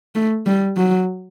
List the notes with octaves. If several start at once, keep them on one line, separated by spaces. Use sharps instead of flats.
A3
G3
F#3